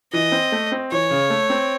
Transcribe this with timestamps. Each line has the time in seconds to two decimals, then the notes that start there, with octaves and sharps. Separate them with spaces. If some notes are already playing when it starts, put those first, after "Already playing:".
0.13 E3 D#5
0.32 C4
0.52 A3
0.72 C4
0.91 E3 C#5
1.11 C#3
1.30 A3
1.50 C4